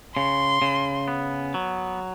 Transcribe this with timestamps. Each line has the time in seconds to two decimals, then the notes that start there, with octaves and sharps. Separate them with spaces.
0.16 C#3 C6
0.62 C#3
1.08 B3
1.54 F#3